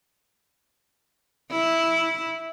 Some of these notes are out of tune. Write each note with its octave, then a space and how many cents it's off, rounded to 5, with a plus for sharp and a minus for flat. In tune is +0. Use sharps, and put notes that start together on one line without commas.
E4 -5